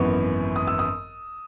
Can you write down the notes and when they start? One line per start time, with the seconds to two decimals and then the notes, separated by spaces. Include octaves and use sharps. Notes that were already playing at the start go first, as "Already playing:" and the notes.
Already playing: G#1 F#2 E3 B3 C#6
0.56 D#6
0.67 E6
0.79 D#6